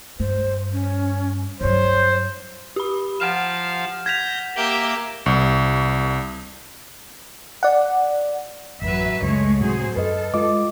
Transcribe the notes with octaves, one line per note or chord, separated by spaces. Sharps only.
G2 C5
C#4
G2 F#3 C5 C#5
G4 B5
F3 F5 F#5 F6 E7
G6 G#6 A#6 B6 F7
A#3 G4 E5
C2
D5 F#5
A1 F#2 F#3 B4 E5
C#2 F#2 G#3 A3 C#5
A2 C3 F#3 G#4 C5
F#2 A4 B4 D#5
G#3 F4 D#5 D6